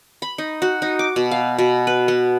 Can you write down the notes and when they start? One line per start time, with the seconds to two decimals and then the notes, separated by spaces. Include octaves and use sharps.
0.22 B5
0.38 D#4
0.62 F#4
0.82 D#4
0.99 D6
1.16 B2
1.31 F5
1.59 B2
1.87 B4
2.08 B3